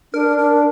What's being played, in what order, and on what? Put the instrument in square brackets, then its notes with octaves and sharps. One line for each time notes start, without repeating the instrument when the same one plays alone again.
[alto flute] D4 [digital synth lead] A#4
[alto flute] D4